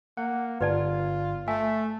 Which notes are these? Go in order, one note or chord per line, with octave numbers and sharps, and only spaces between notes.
A#3 F#5
G1 F4 B4 D5 A5
A3 E5 G#5